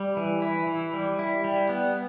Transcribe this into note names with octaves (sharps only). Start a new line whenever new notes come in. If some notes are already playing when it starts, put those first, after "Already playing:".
Already playing: G3
E3
E4
E3
G3
E4
G3
B3